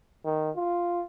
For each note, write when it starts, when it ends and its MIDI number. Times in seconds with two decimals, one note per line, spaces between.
0.25 0.51 51
0.56 1.03 65